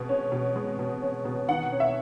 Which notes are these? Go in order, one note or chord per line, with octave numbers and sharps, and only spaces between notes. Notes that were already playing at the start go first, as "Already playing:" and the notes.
Already playing: B2 G#3
C#4
B2
G#3
B2
C#4
B2
D#3 F#5
C#4
E5